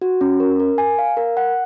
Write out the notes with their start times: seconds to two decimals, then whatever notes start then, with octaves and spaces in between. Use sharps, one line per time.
0.01 F#4
0.21 C#4
0.40 A#4
0.60 A#4
0.78 G#5
0.98 F5
1.17 A#4
1.37 F#5